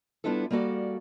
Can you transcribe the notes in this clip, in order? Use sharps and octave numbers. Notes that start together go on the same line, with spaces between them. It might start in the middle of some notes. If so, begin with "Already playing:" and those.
G3 B3 D4 E4 F4 A4
G3 A#3 F#4 A4 D5